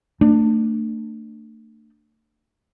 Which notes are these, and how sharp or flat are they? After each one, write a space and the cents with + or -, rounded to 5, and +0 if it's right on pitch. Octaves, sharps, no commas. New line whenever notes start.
A3 +35 D4 +15